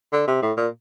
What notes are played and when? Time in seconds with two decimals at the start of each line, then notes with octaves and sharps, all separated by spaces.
0.13 D3
0.27 C3
0.42 A2
0.57 A#2